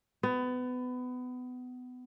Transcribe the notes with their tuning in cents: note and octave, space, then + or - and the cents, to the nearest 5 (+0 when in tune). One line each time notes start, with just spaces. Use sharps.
B3 +25